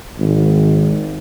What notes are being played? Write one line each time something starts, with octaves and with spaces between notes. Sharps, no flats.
G#1